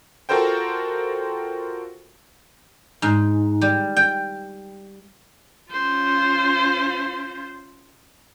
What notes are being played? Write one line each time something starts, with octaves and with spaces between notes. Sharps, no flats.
F4 F#4 A4 A#4 C5 G5
G#2
G3
G5
C#4 F4 C5